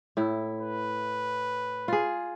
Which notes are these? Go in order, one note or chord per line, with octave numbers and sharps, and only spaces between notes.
A2 E4
B4
F4 G#4